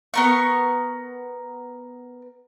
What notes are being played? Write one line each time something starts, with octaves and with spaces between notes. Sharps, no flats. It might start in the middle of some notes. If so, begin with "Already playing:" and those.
B3 A#4 C#6